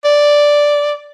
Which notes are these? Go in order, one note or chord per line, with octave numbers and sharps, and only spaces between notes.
D5